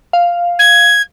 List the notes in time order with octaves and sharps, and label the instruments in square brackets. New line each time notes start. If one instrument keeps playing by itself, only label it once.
[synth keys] F5
[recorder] G#6